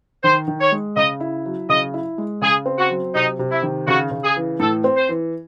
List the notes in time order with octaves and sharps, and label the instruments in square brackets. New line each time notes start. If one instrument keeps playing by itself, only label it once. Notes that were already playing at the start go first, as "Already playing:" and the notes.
[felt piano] D#3 [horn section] C5
[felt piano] D#3
[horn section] C#5
[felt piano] G#3
[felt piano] C#3 [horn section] D#5
[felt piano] E4
F#3
[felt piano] C#3 [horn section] D#5
[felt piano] E4
G#3
[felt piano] C#3 [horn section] G#4
[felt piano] C4
[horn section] F#4
[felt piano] F#3
[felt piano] C3 [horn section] D#4
[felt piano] C3
[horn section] E4
[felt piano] D#3
[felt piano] C#3 [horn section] F#4
[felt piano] C#3
[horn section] G#4
[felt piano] E3
[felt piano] A2 [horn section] A4
[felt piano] C4
[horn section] C5
[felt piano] E3